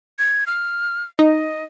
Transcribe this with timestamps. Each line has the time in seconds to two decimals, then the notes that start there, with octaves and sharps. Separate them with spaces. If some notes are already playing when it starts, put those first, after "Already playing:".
0.19 G#6
0.47 F6
1.19 D#4 D#5